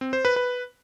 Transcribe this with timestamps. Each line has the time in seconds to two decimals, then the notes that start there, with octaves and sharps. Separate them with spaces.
0.01 C4
0.13 C5
0.25 B4
0.36 B4